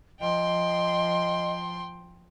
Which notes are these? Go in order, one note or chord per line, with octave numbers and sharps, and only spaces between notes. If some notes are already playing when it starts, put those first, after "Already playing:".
F3 D#5 G5 C6